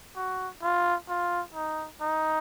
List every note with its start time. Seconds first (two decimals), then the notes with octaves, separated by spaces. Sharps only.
0.16 F#4
0.62 F4
1.09 F4
1.54 D#4
2.01 D#4